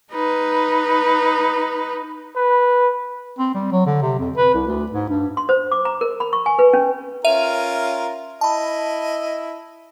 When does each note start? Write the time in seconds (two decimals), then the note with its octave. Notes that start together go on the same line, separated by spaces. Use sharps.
0.12 D#4 B4
2.36 B4
3.39 C4
3.55 G3
3.72 F#3
3.86 D3
4.02 C3
4.18 F2
4.37 B4
4.54 C2
4.67 D2
4.91 G#2
5.09 G2
5.37 C6
5.49 C5
5.71 D6
5.85 A#5
6.01 A#4
6.20 B5
6.33 C#6
6.46 G#5
6.59 B4
6.73 C#4
7.25 C#4 F4 A#4 E5 D#7 F7
8.41 E4 D#5 A5 B5